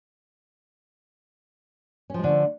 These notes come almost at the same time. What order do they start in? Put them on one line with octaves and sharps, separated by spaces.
C#4 F3 G#3 D3 A3